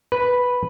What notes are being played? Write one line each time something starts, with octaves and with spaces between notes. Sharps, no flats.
B4